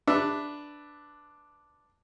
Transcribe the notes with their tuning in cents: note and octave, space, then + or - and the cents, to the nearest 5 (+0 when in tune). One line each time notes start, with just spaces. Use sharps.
D4 +0 B4 +0 E5 +0